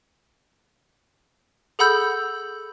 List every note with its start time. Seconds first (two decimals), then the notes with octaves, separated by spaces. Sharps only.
1.79 G#4 A4 F#5 B5 E6 G6